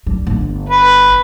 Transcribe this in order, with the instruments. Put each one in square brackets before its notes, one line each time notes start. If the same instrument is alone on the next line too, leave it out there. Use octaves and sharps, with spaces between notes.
[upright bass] G3
G1
[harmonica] B4